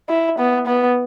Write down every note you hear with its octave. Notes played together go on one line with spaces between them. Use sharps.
E4
B3
B3